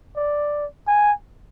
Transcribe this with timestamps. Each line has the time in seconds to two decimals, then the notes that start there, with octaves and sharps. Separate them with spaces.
0.16 D5
0.87 G#5